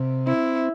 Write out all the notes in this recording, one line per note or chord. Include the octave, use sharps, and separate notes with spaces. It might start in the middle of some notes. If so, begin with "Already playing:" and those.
Already playing: C3
C4 E4